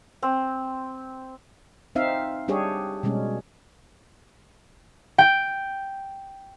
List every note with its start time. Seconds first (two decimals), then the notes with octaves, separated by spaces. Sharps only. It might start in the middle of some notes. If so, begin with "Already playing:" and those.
0.22 C4
1.95 C4 D#4 E5 F5
2.48 G3 D4 G4 G#4 C#5
3.03 B2 G3 G#3 C#4
5.18 G5